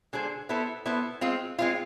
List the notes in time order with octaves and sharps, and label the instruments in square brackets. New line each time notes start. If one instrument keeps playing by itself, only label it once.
[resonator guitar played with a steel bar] D3 G#3 D4 G#4 C5
B3 E4 A4 C5
B3 E4 A4 C5
G#3 C4 F4
G#3 C4 F4